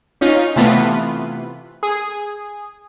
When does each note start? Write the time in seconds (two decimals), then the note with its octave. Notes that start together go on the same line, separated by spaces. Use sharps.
0.21 C#4 D#4 F4 F6
0.56 C3 E3 A3 B3 F4 B4
1.83 G#4